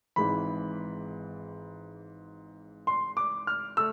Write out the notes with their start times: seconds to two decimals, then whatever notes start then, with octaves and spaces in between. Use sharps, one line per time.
0.16 G#1 G#2 E3 B5
2.87 C6
3.17 D6
3.47 F6
3.77 A3 E6